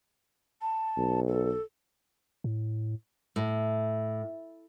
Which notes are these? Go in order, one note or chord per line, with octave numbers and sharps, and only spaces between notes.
A5
B1
A4
A2
A2